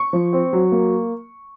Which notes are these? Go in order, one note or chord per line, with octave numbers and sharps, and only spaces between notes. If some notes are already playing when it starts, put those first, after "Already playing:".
Already playing: C#6
F3
C4
F#3
A#3